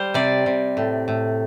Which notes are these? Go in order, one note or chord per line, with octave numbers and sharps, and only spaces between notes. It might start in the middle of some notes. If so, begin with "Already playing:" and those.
Already playing: G3 C5
C3 D5
C3
A2
A2